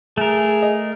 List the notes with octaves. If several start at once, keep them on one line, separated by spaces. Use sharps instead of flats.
A3 G#4 A#4
D#5